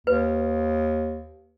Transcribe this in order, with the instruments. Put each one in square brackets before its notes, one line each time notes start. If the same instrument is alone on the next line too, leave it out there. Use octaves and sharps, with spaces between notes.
[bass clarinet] D#2 [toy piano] B4